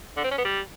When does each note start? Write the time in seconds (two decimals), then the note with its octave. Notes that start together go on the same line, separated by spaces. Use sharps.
0.17 D3
0.24 C4
0.31 C#4
0.38 B3
0.45 G3